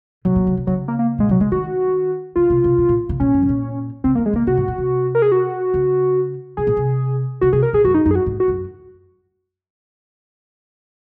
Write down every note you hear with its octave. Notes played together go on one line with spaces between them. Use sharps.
C3 F#3
A#2
C#3
C3
C#3 F#3
A#3
A#3
A#2 G#3
C3 F#3
C#3 G#3
D#3 F#4
C#3 F4
C3
C3
C3
A#2
C#3
A#2 C#4
F#2
C3
A#2
C#3 C4
A#3
D#3
G#3
C#3 A#3
C3 F#4
G#2
A#2
C3
A#4
G#4
F#4
C#3
C3 G#4
A#2
C3
C#3 F#4
C3 G#4
A#4
A#2 G#4
F#2 F#4
D#4
F#2 D#4
G#4
F#4
G#2
F#4
F#2